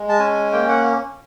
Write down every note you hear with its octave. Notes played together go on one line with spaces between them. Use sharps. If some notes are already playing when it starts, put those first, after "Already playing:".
Already playing: G#3
A5
C#4 G#5
A#3 G5
F#5